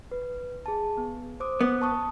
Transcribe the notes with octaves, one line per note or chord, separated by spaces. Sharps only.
B4
G#4 A5
B3
C5 D6 D#6
B3
A5 C#6 D#6